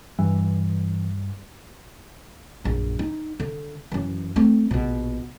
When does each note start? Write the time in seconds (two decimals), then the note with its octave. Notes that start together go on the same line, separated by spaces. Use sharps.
0.19 G2 E3
2.64 A#1 F#2
2.99 D#4
3.40 D3
3.92 F#2 E3
4.36 A3 C4
4.71 A#1 B2